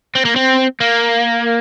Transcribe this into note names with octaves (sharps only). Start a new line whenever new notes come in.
C4
A#3
C4
A#3